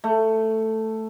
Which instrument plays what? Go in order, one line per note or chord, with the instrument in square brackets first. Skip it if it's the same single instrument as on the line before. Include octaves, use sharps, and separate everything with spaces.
[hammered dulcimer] A3